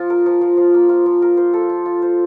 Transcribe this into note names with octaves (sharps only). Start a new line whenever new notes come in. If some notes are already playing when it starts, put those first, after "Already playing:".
Already playing: F3 F4
A#4
F3
F3
F3
A#3
F4
F3
A#4
C5
A4
F4
F4
C5